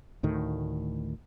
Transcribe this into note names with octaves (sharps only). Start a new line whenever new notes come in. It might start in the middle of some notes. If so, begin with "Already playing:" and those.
D2 A2 D#3